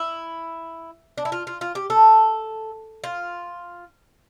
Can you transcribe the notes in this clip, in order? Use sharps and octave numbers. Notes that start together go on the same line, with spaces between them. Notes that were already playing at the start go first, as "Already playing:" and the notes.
Already playing: E4
D4
E4
F4
F4
F4
G4
A4
F4